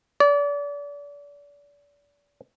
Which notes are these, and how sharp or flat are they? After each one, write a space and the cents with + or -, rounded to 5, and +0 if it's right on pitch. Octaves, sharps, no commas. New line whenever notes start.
D5 -35